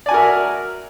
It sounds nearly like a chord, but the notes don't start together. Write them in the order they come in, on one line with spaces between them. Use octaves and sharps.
D5 G#5 F#4 A#4 E5